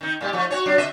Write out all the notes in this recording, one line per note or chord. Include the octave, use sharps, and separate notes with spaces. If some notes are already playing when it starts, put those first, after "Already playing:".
D#3 D#4
A#2 G3 G4
F3 A3
F#4 G4 C#5
F#3 D4
D3 D#5 E5